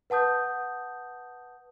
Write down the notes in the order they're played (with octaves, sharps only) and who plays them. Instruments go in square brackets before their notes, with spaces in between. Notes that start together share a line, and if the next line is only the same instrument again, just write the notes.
[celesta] B4 F#5 A5 D#6 G6